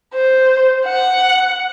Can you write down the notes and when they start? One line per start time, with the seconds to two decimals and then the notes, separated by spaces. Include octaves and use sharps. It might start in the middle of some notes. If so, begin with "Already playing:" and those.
0.14 C5
0.86 F#5